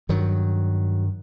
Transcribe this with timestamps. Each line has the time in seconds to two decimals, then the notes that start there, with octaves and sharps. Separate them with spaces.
0.09 G2 D#3 F#3